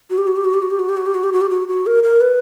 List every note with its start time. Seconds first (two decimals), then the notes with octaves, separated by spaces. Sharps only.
0.10 F#4
0.18 G4
0.27 F#4
0.36 G4
0.45 F#4
0.54 G4
0.62 F#4
0.71 G4
0.79 F#4
0.89 G4
0.97 F#4
1.06 G4
1.14 F#4
1.24 G4
1.33 F#4
1.41 G4
1.50 F#4
1.68 F#4
1.86 A#4
2.03 A#4
2.21 B4